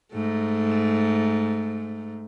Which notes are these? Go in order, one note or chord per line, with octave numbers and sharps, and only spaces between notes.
G#2 A3